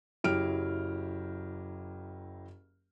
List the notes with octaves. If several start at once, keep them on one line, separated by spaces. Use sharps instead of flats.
F#1 F#3 E4 G4 F6 D7